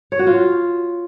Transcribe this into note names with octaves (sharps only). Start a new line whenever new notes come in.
C#5
F#4
F4